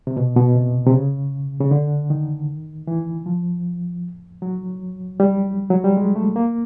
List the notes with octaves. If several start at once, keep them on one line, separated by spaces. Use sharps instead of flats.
C3
B2
B2
C3
C3
C#3
C#3
D3
D#3
E3
F3
F#3
G3
F#3
G3
G#3
A3
A#3